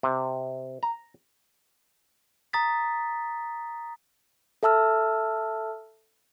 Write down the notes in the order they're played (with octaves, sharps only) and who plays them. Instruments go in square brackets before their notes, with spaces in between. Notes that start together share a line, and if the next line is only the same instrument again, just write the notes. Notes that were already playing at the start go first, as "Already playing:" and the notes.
[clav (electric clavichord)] C3
A#5
[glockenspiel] A#5 D#6 A6 B6
[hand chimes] A4 E5 A5 E6 F6